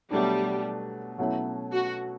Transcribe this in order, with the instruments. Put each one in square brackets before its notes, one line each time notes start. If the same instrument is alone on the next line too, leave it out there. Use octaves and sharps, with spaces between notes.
[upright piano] B2 F#3 A3 D4 [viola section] G3
[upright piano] B2 F#3 A3 C#4 E4
[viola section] F#4